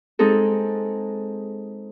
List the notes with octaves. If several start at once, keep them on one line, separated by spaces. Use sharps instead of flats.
G#3 C4 D#4 G#4 A4